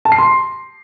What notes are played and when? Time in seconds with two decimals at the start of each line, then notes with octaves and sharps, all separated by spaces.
0.05 A5
0.12 C7
0.18 C6